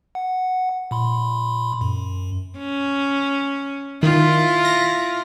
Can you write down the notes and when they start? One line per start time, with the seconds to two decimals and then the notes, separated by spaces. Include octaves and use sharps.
0.15 F#5
0.91 A#2 B5 C6
1.81 F#2
2.58 C#4
4.03 D#3 E4 F4
4.65 A#6